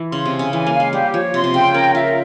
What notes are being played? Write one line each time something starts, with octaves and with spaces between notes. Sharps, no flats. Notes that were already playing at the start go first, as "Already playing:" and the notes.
Already playing: E3
C#3 C6
C3
G#5
C#3
E3 G#5
A#3
F5
G#3
G3 G4
F3 C#5
C3 C6
C3
C#3 G5
C#4 A#4
F4 E5